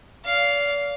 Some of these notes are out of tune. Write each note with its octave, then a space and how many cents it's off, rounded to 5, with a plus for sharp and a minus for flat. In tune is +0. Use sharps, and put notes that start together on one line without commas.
D5 -40 F5 +0